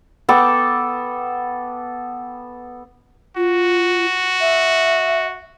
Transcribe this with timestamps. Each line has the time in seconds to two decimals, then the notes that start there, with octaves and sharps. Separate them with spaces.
0.29 B3 A4 G5 D6
3.36 F4 F#4
4.41 E5